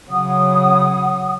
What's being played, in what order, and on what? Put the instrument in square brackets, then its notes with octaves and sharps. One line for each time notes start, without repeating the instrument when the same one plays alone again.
[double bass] C#3 F#3 [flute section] F#5 D#6